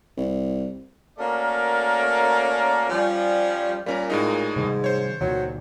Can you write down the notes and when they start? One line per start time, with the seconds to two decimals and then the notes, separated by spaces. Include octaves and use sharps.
0.17 C2
1.19 A3 A#3 C#4 F#4 A#4 D5
2.90 F3 G3 C#4
3.86 A#2 G3 C#4 A#4
4.10 A2 G#3 D#4
4.56 G#2 C3 D#3 G3
4.84 C5 C#5
5.21 C#2 A#2 D#3 F#3